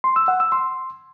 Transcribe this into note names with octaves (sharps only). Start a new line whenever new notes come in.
C6
E6
F#5
E6
C6